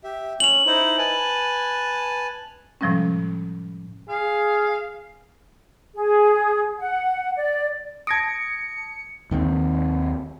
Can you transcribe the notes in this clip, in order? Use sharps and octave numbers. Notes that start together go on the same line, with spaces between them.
G4 E5
C#4 F7 F#7
D#4 E4 C5
B4 G#5 A5
A2 C3 F3 G3 G#3 C#4
G#4 F5
G#4
F#5
D5
A5 D#6 G#6 A#6 C#7 D7
D#2 D#3 A#3 C4